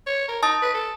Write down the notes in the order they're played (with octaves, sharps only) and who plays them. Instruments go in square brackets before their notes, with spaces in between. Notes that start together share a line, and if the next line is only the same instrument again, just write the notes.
[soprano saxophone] C#5
A#4
[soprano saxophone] D#4 [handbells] A5 D#6 A6
[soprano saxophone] B4
A4